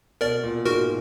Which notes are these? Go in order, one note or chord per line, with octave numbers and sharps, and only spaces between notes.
B2 A#4 D5
A#2
G#2 F#4 A#4